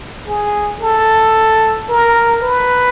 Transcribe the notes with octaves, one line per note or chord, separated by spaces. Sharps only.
G#4
A4
A#4
B4